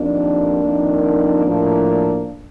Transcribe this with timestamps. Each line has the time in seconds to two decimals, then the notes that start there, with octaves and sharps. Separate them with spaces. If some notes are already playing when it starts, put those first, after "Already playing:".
Already playing: F2 D#3 G3 A#3 D4
0.63 F2 D#3 A#3
1.44 A2 F3 A#3